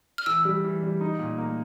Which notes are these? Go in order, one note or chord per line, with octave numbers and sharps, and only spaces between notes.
F6
E3 E6
G3
E3
G3
D#4
A#2
A#3